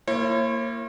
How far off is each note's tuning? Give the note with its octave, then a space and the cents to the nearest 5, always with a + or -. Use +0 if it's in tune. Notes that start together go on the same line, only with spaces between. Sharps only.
A#3 -15 E4 +35 C#5 -40